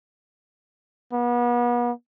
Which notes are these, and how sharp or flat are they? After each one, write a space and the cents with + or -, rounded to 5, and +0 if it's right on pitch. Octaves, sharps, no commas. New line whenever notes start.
B3 -35